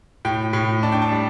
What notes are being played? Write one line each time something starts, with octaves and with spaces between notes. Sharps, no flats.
A2 G5
A2
D4 A5
G5
A5
G3